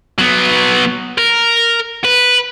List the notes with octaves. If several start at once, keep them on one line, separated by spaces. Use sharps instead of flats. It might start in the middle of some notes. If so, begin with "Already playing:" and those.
F#3 B3
A#4
B4